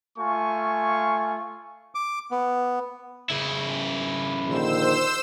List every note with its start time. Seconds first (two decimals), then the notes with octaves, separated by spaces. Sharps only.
0.19 A3 F4 G#5 C#6
1.95 D6
2.31 B3
3.30 C#3 E4
4.48 A#1 D3 D#3 C5 E6 E7